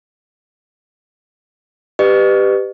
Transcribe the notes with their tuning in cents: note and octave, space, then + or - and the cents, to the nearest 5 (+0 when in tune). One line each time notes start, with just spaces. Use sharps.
G4 +0 B4 +15 D#5 -45